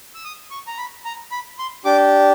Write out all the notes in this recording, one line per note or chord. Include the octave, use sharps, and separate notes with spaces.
E6
D#6
C#6
A#5
B5
A#5
B5
C6
D4 G4 D6